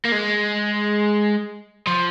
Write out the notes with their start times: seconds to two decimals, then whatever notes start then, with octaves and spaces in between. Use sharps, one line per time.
0.05 A#3
0.12 G#3
1.87 F3